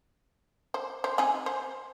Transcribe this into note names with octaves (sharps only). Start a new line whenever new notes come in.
C5
C5
C4 D#4 G#4
C5